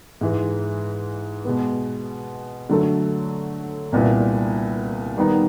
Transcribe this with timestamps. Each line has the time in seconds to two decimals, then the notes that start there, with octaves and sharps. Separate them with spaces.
0.21 G#2 E3 G#3
1.45 B2 G#3 B3
2.70 D3 F#3 A3
3.92 C2 A#2 G3 B3 E4
5.17 D#3 G3 B3 D#4